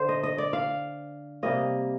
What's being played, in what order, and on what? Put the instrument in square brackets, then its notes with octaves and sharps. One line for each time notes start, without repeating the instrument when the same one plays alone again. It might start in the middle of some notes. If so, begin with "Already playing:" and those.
Already playing: [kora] D3 A3 C5
D#5
D#5
D5
F5
C3 G3 A#3 D#5